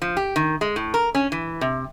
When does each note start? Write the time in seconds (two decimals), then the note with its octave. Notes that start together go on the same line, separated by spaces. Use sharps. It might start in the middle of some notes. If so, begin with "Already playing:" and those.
0.02 F3
0.17 G4
0.36 D#3
0.61 G#3
0.76 A2
0.94 A#4
1.15 C#4
1.32 E3
1.61 C3